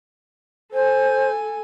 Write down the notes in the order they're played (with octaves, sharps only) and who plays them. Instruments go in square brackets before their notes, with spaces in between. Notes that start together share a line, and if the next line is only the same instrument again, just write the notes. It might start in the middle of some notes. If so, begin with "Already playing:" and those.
[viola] A4 G#5 [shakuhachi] C5